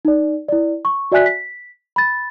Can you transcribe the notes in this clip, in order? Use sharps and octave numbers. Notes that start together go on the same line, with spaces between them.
D#4 D5
E4 D5
C#6
F#4 D5 E5 G#5 F#6 B6
B6
B5 A6